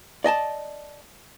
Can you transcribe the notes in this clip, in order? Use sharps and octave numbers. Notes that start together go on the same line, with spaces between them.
D5 D#5 G#5 A5